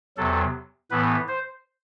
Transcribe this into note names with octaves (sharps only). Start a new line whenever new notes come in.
E2 C3 F#3 A4
A2 E3 B3 B4
C5